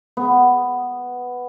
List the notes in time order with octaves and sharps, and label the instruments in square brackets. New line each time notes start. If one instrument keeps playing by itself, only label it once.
[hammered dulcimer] B3